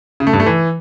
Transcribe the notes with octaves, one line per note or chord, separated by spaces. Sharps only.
C#3
A3
G2
A3
E3